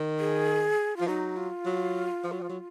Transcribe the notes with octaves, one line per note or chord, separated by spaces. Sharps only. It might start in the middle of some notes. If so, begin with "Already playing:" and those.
Already playing: D#3
G#4
F3 F4
F#3 D#4
F4
F#3
F3
F#3
F3
F#3